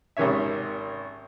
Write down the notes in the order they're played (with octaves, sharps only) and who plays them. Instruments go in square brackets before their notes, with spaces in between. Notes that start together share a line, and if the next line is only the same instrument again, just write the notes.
[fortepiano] G#1 C3 D#3 C#4 C#5 E5